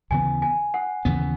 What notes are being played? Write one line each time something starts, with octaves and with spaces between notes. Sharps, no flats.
D#2 C#3 E3 B3 G#5
G#5
F#5
D#2 C#3 E3 B3